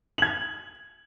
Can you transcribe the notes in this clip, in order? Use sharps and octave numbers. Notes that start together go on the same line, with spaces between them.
G#6 F#7